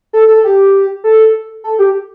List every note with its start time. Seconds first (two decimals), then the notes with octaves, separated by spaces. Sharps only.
0.13 A4
0.28 A4
0.44 G4
1.04 A4
1.64 A4
1.79 G4